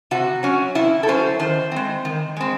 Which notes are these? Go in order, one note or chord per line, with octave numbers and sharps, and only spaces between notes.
C3 F#4
F#3 C#4
C3 E4
A4
F#3 C#4 C5
D#3 C5
G#3 C4
D#3
G#3 C4